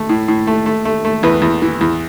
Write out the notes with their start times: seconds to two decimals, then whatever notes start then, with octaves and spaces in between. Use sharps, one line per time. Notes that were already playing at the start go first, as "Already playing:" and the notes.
Already playing: A3
0.09 A2
0.28 A2
0.47 A3
0.66 A3
0.85 A3
1.05 A3
1.23 E2 B4
1.42 E2
1.62 E3
1.81 E2